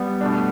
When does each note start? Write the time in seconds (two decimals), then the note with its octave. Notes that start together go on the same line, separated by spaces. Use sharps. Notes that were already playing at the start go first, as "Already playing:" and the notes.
Already playing: G3 B3
0.21 B2 A3 D4